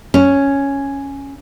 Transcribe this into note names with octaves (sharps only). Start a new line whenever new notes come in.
C#4